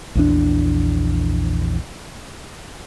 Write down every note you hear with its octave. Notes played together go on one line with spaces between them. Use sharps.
A#1 E2 D4